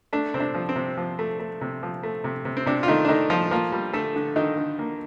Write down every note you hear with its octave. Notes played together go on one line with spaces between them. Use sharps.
A3 D4
C3 C4
D4
F3
C4
C3
F3
A3
A3
C3
F3
A3
C3
C3
C4
C3 D4
F4
D#3 A3 D#4
D4
D#3 A3 D#4
F3 A3 F4
F3 A#3 F4
G3
D3 A3 A4
D3
D3 D#3 D#4
D3
A#3